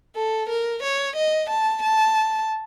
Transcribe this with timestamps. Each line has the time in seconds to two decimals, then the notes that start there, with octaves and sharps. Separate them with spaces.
0.16 A4
0.49 A#4
0.83 C#5
1.16 D#5
1.50 A5
1.83 A5